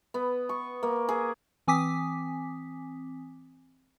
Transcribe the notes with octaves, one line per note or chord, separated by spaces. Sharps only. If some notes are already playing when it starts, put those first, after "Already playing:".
B3
C#6
A#3
G#4
E3 C4 G#5 D6 D#6 B6